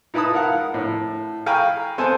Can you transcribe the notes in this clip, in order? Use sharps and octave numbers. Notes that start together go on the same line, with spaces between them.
D#4 E4 B4 A5 B5 D#6
A#4 F5 F#5
A2
F5 G5 G#5 A#5 B5 C#6
B3 C4 A4 C5 G#5 A5